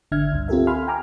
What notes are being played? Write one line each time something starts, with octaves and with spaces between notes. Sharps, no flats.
G#1 D3 D4 E5 F6 G#6
C#2 G2
C4 F4 G4 A4 A#4 E5
F5 G#5 B5 C6 F6
G5 G#5 A#5 D6 F6